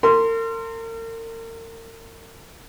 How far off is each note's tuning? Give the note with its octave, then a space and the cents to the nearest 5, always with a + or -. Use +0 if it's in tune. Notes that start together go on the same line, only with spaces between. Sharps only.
A#4 -40 C6 +0